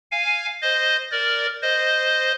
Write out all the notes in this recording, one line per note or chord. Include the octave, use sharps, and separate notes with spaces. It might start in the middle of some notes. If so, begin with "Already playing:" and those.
F5 G#5
C5 D#5
A#4 D5
C5 D#5